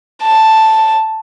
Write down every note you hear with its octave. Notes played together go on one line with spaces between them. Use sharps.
A5